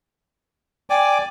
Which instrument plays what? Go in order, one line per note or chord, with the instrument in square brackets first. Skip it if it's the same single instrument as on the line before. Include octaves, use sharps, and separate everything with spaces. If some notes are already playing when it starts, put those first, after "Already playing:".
[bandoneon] D5 G#5 D6 [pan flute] G5